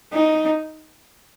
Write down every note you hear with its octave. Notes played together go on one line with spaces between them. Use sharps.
D#4